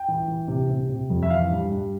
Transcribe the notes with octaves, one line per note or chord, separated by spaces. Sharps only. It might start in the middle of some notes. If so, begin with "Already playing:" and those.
Already playing: G5
E3
E3
C3
C3
C3
F2
E5
E3 F5
G2
G2